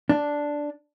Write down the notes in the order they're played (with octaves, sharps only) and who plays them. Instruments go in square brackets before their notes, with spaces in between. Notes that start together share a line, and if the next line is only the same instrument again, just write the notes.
[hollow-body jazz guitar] D4